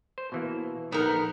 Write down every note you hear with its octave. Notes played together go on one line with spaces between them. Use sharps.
C5
B2 E3 A#3
A#1 B3 D#4 A#4